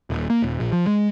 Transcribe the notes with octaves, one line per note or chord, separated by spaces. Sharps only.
D#1
A#3
D#1
A#1
F3
G#3